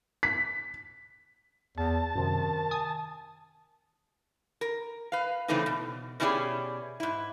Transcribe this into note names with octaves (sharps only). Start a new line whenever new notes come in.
B6
E2 A5
F#2 C3 D#3
G#5 D#6
A#4
B4 F5
C#3 E3 A3 C4 D4 D#4
B2
B2 C#4 E4 G4 G#4 D5
G#2 E4